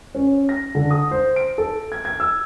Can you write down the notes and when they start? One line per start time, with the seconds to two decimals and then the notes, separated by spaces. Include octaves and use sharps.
0.15 C#4
0.49 A#6
0.75 D3
0.91 D#6
1.11 C5
1.36 D7
1.58 A4
1.92 G#6
2.05 G#6
2.20 E6